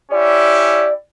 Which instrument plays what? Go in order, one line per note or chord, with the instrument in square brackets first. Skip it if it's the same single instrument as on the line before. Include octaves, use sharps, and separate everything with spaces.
[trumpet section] C#4 E4 G4 [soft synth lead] D5